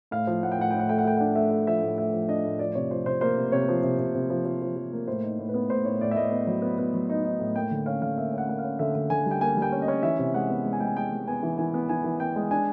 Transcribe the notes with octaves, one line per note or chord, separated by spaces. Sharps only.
A2 F5
F3
A2 F#5
G5
A2 F#5
A2 G5
F#5
A3 G5
F#5
A3 G5
D4 F#5
A3 E5
A3
F3 E5
A2
A3 E5
F3
D4 D#5
A2
F3 D5
C3 C#5
F3 C5
C3 C5
A#3 C5
C3
C3 C#5
F3
C3
C3
C3
F3
F3
F3
F3
A#3
A2 C5
D#4
A2
B4
B3
A2 C5
A2 C#5
A2 D5
E5
A2 D#5
B3
F#3
B3
B3
F#3
D#4
D#4
A2
A#3 G5
D3
C#4 F5
D3 F5
A#3 E5
C#4
F#5
A#3 F#5
F5
C#4
D3 E5
D3
D3 G#5
G3
G5
A#3 G#5
G3
G5
C#4
D#5
C#4
E3 E5
C3
G#3 F#5
B3
G#3
G#5
G#3 G5
G#5
G#3 G5
G#3
B3 G#5
E3
E3 G#5
B3
E3 G#5
E3
B3 G5
G#3
D4 G#5